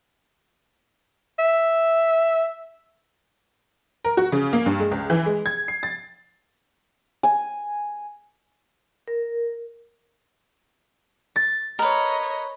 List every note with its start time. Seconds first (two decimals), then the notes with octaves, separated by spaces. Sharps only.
1.39 E5
4.04 A#4
4.17 F#4
4.32 C#3
4.53 A#3
4.66 G2
4.80 G#3
4.91 C#2
5.10 E3
5.26 G#3
5.46 G#6
5.68 C7
5.83 A6
7.23 G#5
9.08 A#4
11.36 A6
11.79 A#4 B4 C#5 D#5